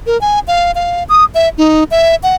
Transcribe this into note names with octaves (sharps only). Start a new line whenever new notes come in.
A#4
G#5
F5
F5
D#6
E5
D#4
E5
F#5